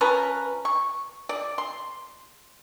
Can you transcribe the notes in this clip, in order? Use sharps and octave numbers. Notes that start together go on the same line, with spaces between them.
F3 C#4 A#4 B4
C#6
D5
C6